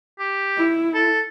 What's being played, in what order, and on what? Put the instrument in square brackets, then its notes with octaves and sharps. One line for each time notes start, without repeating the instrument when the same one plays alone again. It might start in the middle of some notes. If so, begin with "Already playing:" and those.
[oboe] G4
[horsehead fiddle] E4
[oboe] A4